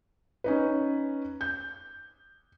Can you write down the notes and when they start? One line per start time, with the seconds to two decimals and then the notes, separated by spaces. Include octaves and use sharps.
0.44 C#4 D#4 B4
1.41 G6